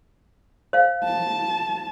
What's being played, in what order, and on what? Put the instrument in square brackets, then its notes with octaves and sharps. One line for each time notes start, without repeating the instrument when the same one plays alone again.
[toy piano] C5 F5
[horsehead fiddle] A5